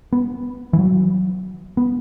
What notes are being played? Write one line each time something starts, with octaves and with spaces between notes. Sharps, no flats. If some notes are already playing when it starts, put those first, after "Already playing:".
B3
E3
F#3
B3